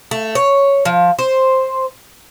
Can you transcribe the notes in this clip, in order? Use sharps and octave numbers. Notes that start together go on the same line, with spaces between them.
A3
C#5
F3
C5